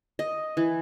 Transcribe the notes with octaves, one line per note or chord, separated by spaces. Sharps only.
D#5
E3